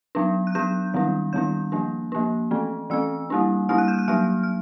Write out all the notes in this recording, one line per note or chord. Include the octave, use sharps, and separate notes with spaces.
F#3 B3 D4
F#6
F#3 B3 D4 G6
D#3 G3 B3 D4
D#3 G3 B3 D4 G6
F3 A#3 D4
F3 A#3 D4
E3 A3 C4
E3 A3 C4 E6
G3 A#3 D4
G3 A#3 D4 F6
F#6
G6
F#6
F#3 A#3 D4 F6
F6